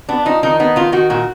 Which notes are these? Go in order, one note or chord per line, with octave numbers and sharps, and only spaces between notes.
B3 D4
F3 D#4
D#3 D#4
B3 D#4
D#3 F4
D#3 F#4
A#2 F#4